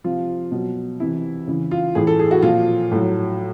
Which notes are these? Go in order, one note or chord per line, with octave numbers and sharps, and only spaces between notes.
C3 F3 F4
B2 F#3
C3 E3 E4
C#3 E3
F4
A2 E3 G#4
A4
G#4
F#4
A#2 F3 F4
A2 F#3